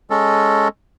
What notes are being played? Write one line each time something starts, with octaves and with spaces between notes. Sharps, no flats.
G#3 C#4 A4